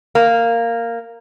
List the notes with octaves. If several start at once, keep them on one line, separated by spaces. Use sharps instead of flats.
A#3